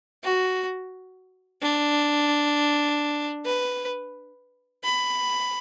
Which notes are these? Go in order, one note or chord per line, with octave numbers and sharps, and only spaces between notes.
F#4
D4
B4
B5